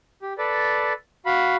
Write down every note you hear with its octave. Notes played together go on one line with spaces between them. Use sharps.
G4
A4 B4 D5
F#4 F5 B5